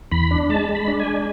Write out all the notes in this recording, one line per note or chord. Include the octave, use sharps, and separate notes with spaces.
E2 B5
D4
G#3 A5
G#3
B5
D4
G#5
G#3